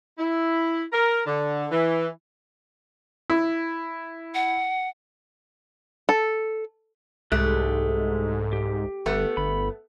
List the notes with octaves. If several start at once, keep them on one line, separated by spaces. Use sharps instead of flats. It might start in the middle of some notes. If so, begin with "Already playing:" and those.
E4
A#4
D3
E3
E4
F#5
A4
C2 G#2 G#3 A3 G4 F#6
G4
G1 A3 B3
G1 B5